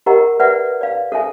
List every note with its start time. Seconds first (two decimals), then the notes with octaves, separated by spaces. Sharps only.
0.06 G4 A#4 D#5 F#5 A#5
0.40 B4 D5 E5 F#5
0.81 D5 F5
1.12 A4 E5 G#5